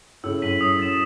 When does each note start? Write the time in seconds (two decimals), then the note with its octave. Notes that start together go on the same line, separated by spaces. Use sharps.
0.24 A2 C#3 E6
0.42 F#2 A2 B6 D#7 F#7
0.61 F#2 D#6
0.79 F#2 A6 E7